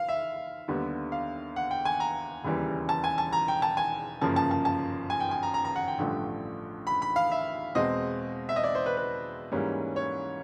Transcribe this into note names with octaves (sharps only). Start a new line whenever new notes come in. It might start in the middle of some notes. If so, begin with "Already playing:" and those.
Already playing: F5
E5
D#2 D3 G3 B3
F5
F#5
G5
G#5
A#5
E1 D#2 C#3 E3 G3
A5
G#5
A5
A#5
G5
A5
G#5
G1 F#2 C#3 F3 A#3 A5
A5
A5
A5
G#5
G5
G#5
A#5
A#5
A#5
F#5
G5
A1 G2 D3 F3 A3
B5
B5
F5
E5
E2 B2 G#3 C4 D#5
E5
D#5
D5
C5
B4
B4
G#2 E3 G3 A#3 C#4
C#5